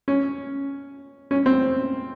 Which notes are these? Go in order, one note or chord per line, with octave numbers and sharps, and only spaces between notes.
C#4
C#4
C4